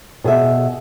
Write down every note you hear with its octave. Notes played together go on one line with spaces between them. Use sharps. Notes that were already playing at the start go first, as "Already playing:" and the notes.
B2 G#4 C5 E5